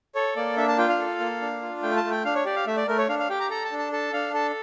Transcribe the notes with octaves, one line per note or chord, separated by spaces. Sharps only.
A4 C#5
A#3 D5
D4 E5
A5
F4 G5
F5
A4
A#3
D4
F4
A3 G5
A5
A3
G5
D4 F5
C#5
G4 D5
F5
A3 E5
D5
A3 A#4
C#5
D4 F5
F5
G4 G5
A#5
A4 A#5
A5
D4
A5
A4 A5
D4 F5
A4 A5